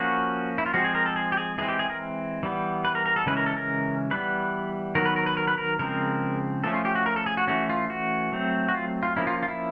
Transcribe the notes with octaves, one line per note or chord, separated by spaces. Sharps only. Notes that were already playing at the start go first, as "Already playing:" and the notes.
Already playing: F3 A#3 C#4 F#4
E4
F4
F3 G#3 C4 F#4
G#4
A#4
A4
G#4
G4
G#4
E3 G#3 C4 G#4
G4
G#4
A#4
E3 G3 B3
B4
A#4
A#4
A4
C#3 E3 G#3 C#4 B4
A#4
A4
A#4
E3 G3 B3 B4
D#3 F#3 B3 A#4
B4
A#4
B4
A#4
B4
A#4
C#3 F3 G#3 C4 A#4
F3 A3 C#4 A4
F4
G4
F#4
A#4
A4
G#4
F#4
E3 A3 C#4 F#4
F4
F#4
F#3 A3 C4
F#4
F4
F4
F3 A#3 C#4 E4
F4
F4
E4